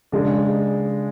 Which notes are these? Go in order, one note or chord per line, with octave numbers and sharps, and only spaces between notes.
C#3 G#3 D4